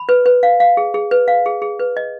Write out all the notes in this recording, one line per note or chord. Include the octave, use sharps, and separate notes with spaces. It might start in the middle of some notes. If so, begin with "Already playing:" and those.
Already playing: B5
B4
B4
F5
F5
G#4
G#4
B4
F5
G#4
G#4
B4
D#5